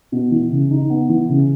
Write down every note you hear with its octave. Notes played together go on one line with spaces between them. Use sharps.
B2
E3
C#3
D#4
B3
E3
C#3